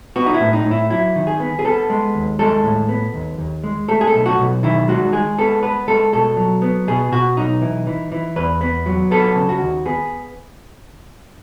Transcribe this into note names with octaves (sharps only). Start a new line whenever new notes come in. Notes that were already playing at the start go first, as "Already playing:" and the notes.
B3 F#4
D#4
E4
A2
D#4
A2
E4
F#3 E4
D#3
G#4
B3
G#4
B3 A4
G#3
D#2
G#3 A4
A2
B3
D#2
D#2
G#3
A3 A4
G#4
A4
B1
F#4
B1
D#3 E4
G#3 F#4
G#3 G#4
B3 A4
B3 B4
G#3 A4
B2 A4
F#3
B3
B2 G#4
B2 F#4
B1 D#4
E3
E3
E3
E2 B4
B3
F#3
B3 A4
C#3
F#4
D#2
B3 G#4